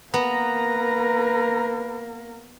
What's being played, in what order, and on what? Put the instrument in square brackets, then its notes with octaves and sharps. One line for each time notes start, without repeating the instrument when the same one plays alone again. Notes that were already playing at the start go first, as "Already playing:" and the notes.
[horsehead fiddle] A#3 A#4 [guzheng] B3 [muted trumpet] B4 [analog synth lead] A#5